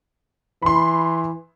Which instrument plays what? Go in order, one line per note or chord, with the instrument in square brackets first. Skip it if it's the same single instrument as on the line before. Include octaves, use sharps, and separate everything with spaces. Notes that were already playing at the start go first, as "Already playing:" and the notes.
[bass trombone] E3 [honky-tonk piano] B5 C6